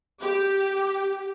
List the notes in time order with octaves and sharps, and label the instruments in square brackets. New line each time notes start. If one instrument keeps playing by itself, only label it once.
[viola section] G4